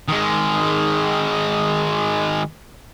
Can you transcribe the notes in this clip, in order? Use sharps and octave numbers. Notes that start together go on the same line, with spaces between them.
D#3 G#3